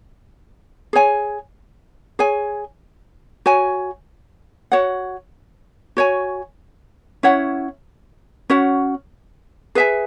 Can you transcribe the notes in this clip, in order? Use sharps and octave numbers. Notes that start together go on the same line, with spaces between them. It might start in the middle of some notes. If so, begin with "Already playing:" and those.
G#4 C#5 G#5
G#4 C#5 G#5
F#4 C#5 G#5
F#4 C#5 F#5
F#4 C#5 G#5
C#4 E4 C#5 F#5
C#4 F#4 C#5 F#5
G#4 B4 E5 G#5